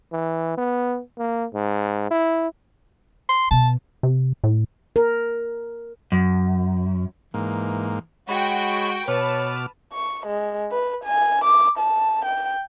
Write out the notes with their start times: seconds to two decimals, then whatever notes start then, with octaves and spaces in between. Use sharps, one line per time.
0.12 E3
0.58 B3
1.18 A#3
1.54 G#2
2.11 E4
3.29 C6
3.51 B2 A5
4.03 C3
4.44 A2
4.96 A#4
6.12 F#2
7.34 G#2 E3 A#3
8.29 G#3 F#4 C#5 G5 B5
9.08 B2 B4 C#5 A5 D6 F6
9.93 C#6
10.26 G#3
10.71 B4
11.04 G#5
11.44 D6
11.78 A5
12.25 G5